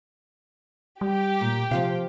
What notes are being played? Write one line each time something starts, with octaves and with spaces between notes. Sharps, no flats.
G3 G4
A#2
C3 F3 F4 F5